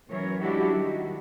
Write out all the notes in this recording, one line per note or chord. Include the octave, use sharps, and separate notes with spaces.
E3 F#3 C#4 A#4 C#5
F#3 G#3 D4 E4 F#4 G4
D#3 G3 F#4